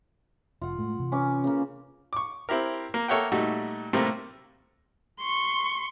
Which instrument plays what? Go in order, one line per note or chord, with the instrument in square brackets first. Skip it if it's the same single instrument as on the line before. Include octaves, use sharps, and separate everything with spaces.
[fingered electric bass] F1 [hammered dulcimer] F4 F#5
[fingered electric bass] A2 G#3 A3
C3 E3
[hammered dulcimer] C#4 B4 D6
C#3 A#3
[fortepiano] C#6 D6
C4 E4 G4 A#4
A#3
A#3 A4 C#5 E5 F#5 G5
A#2 G3 A3 D#4 F#4
A2 C3 G3 A3 A#3 C4
[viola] C6 C#6